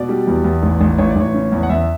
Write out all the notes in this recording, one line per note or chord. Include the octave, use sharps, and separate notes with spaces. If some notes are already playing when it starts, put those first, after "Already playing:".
Already playing: B2 D5
G3
E2
E2
A1
A1
A1 C#5
D5
A1 C#5
C#3
E2
F#5
E2 E5